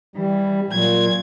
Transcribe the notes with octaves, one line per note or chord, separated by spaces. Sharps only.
E3 G3
A#2 F#3 G#6